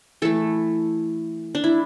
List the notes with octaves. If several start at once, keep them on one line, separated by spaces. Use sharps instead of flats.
E3 A3 A4
D4
E4